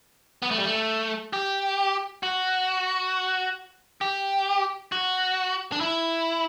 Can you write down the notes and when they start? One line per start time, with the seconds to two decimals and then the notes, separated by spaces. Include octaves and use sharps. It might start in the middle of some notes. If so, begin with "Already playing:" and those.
0.42 B3
0.51 A3
0.58 G3
0.65 A3
1.33 G4
2.23 F#4
4.01 G4
4.92 F#4
5.72 D4
5.81 E4